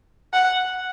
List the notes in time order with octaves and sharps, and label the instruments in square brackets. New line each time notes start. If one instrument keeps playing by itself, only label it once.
[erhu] F#5